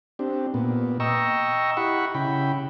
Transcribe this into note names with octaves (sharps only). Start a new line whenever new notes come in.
C4 D4 G4
A#2 B3
D#5 G5 A#5 C#6 E6
E4 G4 F#5 B5 C#6
C#3 E4 G5 B5